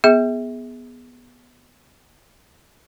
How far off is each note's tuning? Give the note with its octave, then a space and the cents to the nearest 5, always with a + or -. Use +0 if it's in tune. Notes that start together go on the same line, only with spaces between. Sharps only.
B3 -5 G#4 +0 E5 -30